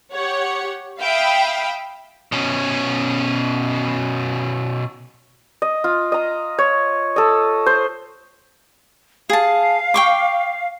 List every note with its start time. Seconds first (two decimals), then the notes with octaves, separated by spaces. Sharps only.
0.12 G4 C#5 F#5
1.00 E5 F5 G5 B5 D#6
2.32 B2 C#4
5.62 D#5
5.84 F4
6.12 D#5 A#5
6.59 C#5
7.16 A4 D#5
7.66 C5
9.30 G#4 F5 A5
9.94 G5 C#6 D6